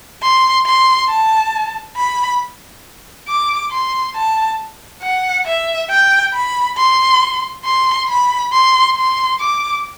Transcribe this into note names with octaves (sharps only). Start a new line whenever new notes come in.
C6
C6
A5
B5
D6
C6
A5
F#5
E5
G5
B5
C6
C6
B5
C6
C6
D6